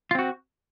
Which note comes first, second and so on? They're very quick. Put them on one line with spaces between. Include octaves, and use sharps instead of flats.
F4 C4 F#4